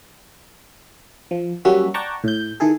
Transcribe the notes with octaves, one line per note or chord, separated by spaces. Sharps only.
F3
F#3 G3 A#3 C#4 F#4 E5
D5 F#5 G5 A5 A#5 C#6
A2 G6
D#3 E4 G#4 A4